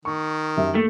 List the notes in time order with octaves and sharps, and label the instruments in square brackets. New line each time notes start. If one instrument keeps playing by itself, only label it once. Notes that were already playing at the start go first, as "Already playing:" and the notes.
[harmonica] D#3 [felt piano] C#6
[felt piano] F#2 G4 E5
[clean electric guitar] A3 [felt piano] A#3